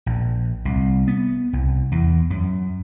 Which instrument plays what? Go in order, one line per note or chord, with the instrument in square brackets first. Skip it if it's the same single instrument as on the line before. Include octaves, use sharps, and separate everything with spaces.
[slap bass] A#1
C2
B3
C2
E2
F#2